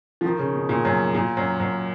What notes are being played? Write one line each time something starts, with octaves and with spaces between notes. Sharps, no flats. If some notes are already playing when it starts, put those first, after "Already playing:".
F3
D#3
C#3
B2
A#2
F#2
A#2
F#2
F#2